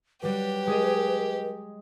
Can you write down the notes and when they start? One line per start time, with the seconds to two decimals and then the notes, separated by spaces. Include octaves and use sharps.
0.23 F#3 G3 G4 B4
0.67 G#3 G#4 D#5